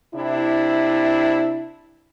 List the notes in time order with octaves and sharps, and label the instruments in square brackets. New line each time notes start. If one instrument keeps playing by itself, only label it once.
[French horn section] C3 D4 E4